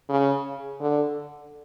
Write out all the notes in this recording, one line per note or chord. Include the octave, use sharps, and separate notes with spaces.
C#3
D3